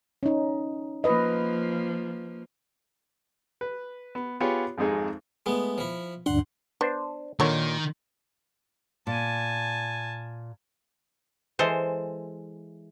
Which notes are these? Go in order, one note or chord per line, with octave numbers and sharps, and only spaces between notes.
C#4 D#4
F3 A#3 B4 D#5
B4
B3
B3 F4 G4 G#4 C#5
G#1 F2 G#3 D#4 G#4
G#3 A3 B3
F3 E4
D2 G2 D4 F#5 C6
B3 D4 C5
A#2 D3 D#3 A#4 C#5
A#2 G#5 A5
E3 G#3 A4 C5